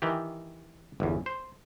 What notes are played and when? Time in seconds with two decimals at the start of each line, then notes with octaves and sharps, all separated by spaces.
0.02 D#3 E3 G4
1.00 G1 E2
1.26 C5